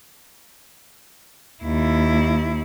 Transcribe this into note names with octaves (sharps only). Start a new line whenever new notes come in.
D#2 E4